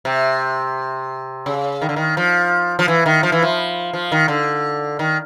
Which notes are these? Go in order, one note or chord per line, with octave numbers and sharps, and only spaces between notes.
C3
C#3
D#3
D3
D#3
F3
F3
E3
D#3
F3
E3
F3
F3
D#3
D3
D#3